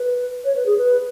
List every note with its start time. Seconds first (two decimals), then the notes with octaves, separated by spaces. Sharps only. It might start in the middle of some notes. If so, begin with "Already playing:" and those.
Already playing: B4
0.45 C#5
0.56 B4
0.66 G#4
0.78 B4